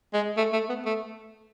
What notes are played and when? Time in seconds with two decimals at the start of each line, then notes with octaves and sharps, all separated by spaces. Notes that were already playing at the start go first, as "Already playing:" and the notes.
0.13 G#3
0.37 A3
0.53 A3
0.69 B3
0.86 A3